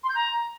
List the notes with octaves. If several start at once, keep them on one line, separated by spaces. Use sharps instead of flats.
C6
G6
A#5